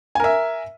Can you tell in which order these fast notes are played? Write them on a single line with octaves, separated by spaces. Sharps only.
G#5 A#4 E5